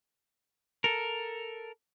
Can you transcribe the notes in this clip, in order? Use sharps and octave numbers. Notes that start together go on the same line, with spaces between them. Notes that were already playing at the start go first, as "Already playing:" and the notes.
A4 A#4